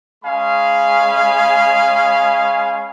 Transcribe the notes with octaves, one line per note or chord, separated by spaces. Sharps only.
G#3 C#4 G#4 F5 G#5 B5